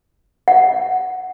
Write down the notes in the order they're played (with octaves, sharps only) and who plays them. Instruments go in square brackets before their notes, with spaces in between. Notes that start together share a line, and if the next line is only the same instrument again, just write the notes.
[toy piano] F#5